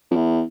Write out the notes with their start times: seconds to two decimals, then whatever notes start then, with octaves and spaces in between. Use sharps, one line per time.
0.11 F2
0.16 E2